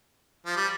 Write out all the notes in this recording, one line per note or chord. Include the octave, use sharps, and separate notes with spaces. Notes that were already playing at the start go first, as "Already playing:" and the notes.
F3
G3